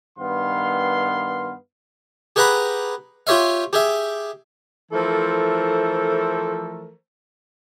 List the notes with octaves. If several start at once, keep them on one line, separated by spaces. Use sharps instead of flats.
G2 D#3 B3 F5 C6
G4 G#4 B4 F#5 A#5 B5
F4 G4 C#5 E5 F5
G4 G#4 E5
E3 F3 A3 A4 A#4 C5